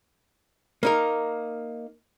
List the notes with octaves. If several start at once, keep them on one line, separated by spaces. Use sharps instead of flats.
A#3 D#4 A#4